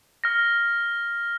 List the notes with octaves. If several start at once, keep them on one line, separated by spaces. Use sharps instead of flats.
F6 A#6